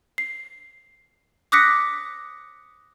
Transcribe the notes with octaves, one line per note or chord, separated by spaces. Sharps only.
C7
D6 D#6 F#6 A#6 B6 C#7